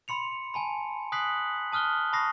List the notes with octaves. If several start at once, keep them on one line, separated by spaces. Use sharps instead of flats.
B5 C6 C#7 F7
G#5 A5 B5
G#5 D#6 F#6 B6 C7 F#7
A5 D#6 F6 F#6 G7
A5 B5 C#6 D#6 A#6 C7